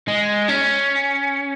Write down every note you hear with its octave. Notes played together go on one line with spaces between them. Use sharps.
G#3
C#4